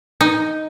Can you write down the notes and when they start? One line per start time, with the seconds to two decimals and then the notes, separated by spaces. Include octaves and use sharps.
0.21 D#4